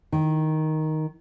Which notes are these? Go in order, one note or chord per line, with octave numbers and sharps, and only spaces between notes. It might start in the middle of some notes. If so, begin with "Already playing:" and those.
D#3